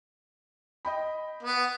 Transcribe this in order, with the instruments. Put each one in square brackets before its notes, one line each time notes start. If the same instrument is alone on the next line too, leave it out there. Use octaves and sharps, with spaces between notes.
[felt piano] D#5 G5 B5
[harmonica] B3